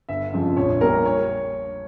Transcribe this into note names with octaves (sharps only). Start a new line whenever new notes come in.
G1 E5
F2 C#3 F3 G#3
A#1 C#5
A#2 G3 A#4
C#5